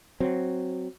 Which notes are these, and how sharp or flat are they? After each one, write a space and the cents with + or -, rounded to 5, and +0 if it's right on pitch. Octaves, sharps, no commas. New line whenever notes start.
F#3 +0 C4 +0